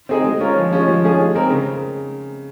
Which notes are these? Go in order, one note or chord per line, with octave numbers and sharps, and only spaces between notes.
C4 D#4 G#4 D#5
G#3
C#4 F4 A#4 C#5
F3
G#3 C#4 F4
F3
G#3 C#4 F4 G#4
G#3
C4 D#4 A#4
C#3